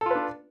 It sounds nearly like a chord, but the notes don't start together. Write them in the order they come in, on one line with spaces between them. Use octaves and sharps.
A4 F4 B4 D4